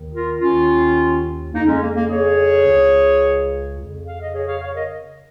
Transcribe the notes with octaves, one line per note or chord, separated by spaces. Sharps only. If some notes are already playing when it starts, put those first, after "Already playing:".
Already playing: D#2 D#3
F4 A#4
D#2 D#3 C#4 F4
F2 C#3 A#3 D#4
G#3 C#4
A#3
A#3
G#4 C#5
C#2 C#3
F2 C#3
F5
D#5
G#4 C#5
C#5 F5
C#5 F5
A#4 D#5